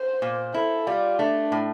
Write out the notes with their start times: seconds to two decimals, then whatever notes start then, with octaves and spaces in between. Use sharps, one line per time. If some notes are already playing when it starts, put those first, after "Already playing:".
Already playing: C5
0.22 A#2
0.54 E4 A4
0.86 G3 F4
1.19 A3 D4
1.52 A2